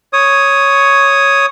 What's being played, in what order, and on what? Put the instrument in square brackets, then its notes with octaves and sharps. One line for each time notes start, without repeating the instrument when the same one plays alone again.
[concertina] C#5 D#6